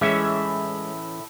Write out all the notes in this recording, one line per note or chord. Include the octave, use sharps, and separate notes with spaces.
A2 E3 G#3 C#4 E5